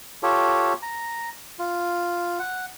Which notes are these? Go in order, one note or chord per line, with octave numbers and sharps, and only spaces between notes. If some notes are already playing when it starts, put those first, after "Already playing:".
F4 G4 A4 C#5
A#5
F4
F#5